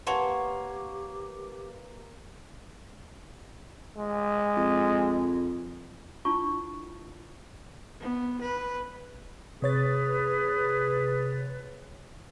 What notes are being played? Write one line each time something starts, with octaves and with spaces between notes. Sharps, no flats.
A#3 G4 B4 C#5 F#5 A5 C6 F7
G#3
F2
D4 E4 F4 G#5 A5 C#6
B3
B4
C3 G#4 B4 C#5 A6